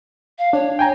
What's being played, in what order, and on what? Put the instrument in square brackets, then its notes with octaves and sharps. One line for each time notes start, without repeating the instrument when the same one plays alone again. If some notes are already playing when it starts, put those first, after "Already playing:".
[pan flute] F5
[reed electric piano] D4 [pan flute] C#5
[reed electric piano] G5 G#5 A#5